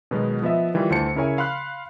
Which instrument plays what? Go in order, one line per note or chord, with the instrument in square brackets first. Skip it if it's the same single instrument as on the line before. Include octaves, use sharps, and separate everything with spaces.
[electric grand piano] B2 D#3 F#3 G#3 B3
F3 B3 D#5 E5
D#3 E3 G3 F4
D2 E3 C5 A5 C#7
C#3 E4 A#4 C#5 G#5
F5 B5 C6 F6 F#6